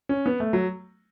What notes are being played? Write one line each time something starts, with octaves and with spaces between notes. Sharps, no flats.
C#4
B3
A3
F#3